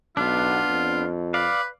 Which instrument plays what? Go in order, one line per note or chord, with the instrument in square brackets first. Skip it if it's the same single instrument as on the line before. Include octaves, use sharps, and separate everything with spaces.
[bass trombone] B1 [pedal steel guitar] B3 D4 [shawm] F4
[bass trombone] F2
[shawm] B4 [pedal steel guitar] D5 F5